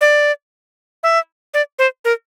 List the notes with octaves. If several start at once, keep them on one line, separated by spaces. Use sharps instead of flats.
D5
E5
D5
C5
A#4